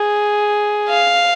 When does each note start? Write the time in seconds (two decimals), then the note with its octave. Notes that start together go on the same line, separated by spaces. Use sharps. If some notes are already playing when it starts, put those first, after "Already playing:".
Already playing: G#4
0.89 F5